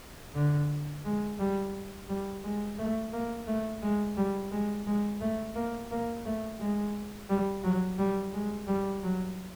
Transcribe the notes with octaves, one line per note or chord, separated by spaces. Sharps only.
D3
G#3
G3
G3
G#3
A3
A#3
A3
G#3
G3
G#3
G#3
A3
A#3
A#3
A3
G#3
G3
F#3
G3
G#3
G3
F#3